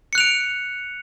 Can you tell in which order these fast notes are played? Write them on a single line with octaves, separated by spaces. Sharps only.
C#7 F#6 F7 D7